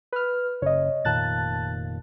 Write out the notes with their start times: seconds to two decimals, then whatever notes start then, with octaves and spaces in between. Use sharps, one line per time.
0.13 B4 F6
0.62 F#1 C#3 C#5 D#5
1.05 F1 A#2 D#3 A5 F#6 A6